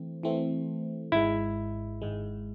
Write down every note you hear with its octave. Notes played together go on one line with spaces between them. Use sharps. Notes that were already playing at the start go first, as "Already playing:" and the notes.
Already playing: E3 A3 C4
E3 A3 C4
G#1 G#2 G#3 E4
G#1 G#2 G#3